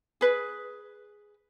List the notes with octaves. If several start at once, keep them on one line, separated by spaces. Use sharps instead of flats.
G#4 B4